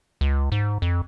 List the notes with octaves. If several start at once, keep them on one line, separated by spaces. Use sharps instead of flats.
C#2
G#2
F2